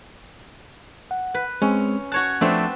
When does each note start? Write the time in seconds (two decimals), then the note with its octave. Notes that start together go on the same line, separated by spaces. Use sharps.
1.11 F#5
1.34 B4
1.62 G#3 C4 C#4
2.12 F#4 C#5 A5 F#6
2.41 F3 A3 B3 C4 D4